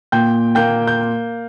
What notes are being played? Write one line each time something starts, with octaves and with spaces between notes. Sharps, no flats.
A#2 G5 G6
A#3 G5 G6
G6